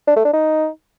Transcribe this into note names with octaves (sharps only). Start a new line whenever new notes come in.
D4
A3
D4
D#4